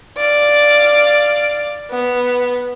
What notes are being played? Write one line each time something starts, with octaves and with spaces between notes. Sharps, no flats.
D5 F5
B3